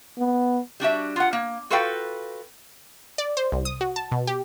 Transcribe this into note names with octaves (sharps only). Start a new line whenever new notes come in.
B3
G3 D4 F#4 E5
F4 F#5
A#3
F4 F#4 A4 B4 F5 G5
D5
C5
C2
D#6
F#4
A5
B2
G4